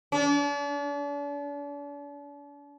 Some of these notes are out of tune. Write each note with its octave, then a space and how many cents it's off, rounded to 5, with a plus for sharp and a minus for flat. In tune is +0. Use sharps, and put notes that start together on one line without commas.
D4 -40